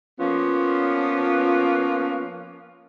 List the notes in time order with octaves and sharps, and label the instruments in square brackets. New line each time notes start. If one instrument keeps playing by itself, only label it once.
[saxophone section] F3 A#3 B3 C#4 F4